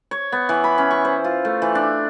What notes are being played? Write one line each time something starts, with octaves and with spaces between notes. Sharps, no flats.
C#5
B3
E3
B5
C#4
C#6
C5
F4
A3
E3
D4